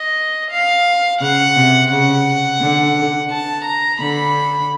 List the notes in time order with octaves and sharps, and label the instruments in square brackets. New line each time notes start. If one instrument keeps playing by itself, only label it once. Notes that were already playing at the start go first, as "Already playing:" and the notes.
Already playing: [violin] D#5
F5
[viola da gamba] C#3 [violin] F#5
[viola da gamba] C3
[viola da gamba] C#3 [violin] F#5
[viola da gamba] D3
[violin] A5
A#5
[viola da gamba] D3 [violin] B5